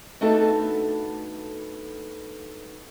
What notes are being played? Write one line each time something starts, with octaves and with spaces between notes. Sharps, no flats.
A3 B3 D4 D#4 F#4 A4